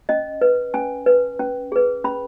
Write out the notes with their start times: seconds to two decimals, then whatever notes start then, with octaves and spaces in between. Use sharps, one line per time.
0.09 C#4 D#5
0.41 B4
0.74 C#4 G#5
1.06 B4
1.39 C#4
1.72 G#4 B4
2.04 C#4 B5